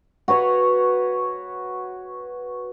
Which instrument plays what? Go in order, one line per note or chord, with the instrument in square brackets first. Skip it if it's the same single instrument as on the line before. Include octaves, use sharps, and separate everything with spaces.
[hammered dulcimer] F#4 B4 C#5